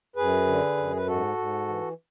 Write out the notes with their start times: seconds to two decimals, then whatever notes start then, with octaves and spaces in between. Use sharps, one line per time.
0.16 F#2 G#4 B4
0.47 D3
0.77 F#2
0.96 B4
1.07 G#2 F#4 A4
1.37 G#2
1.68 E3